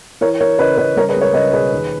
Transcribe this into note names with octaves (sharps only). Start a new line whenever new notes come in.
E3 A#4 C#5
E3 A#4 C#5
C#3 B4 D#5
C#3 B4 D#5
G3 A#4 C#5
G#4 B4
C#2
A#4 C#5
C#2 B4 D#5
B2 G#4 B4
D#2